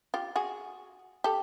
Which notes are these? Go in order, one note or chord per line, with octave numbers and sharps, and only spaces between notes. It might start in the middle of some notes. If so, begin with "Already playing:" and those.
F4 G4
F#4 G#4
G4 A4